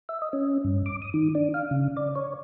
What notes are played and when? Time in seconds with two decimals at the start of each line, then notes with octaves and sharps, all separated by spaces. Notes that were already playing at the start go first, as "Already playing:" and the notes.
0.09 E5
0.22 D#5
0.33 C#4
0.64 G2
0.86 D6
1.02 D#6
1.14 D#3
1.35 D4
1.54 F5
1.71 C#3
1.97 D5
2.15 C#5